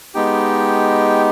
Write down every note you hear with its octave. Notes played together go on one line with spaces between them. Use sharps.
G#3 B3 D#4 G4 G5